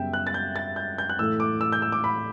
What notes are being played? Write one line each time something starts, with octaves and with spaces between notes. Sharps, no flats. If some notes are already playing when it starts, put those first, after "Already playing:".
Already playing: F#2 C#3 G3 B3 E5 G5
F#6
A6
G6
A6
G6
G6
F#6
A2 E3 A3 E6
D6
E6
G6
E6
D6
B5